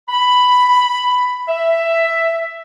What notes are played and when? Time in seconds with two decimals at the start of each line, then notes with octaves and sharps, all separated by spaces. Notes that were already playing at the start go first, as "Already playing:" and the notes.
0.09 B5
1.48 E5